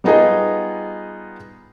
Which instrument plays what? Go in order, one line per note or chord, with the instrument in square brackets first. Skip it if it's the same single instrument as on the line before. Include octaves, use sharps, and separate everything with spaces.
[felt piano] G3 B3 D#4 F4 G#4 D#5